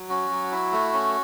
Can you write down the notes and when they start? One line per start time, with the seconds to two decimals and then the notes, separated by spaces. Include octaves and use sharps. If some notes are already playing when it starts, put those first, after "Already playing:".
Already playing: F#3
0.09 C#4 F#4
0.30 F#3
0.52 E4
0.72 A3
0.94 C#4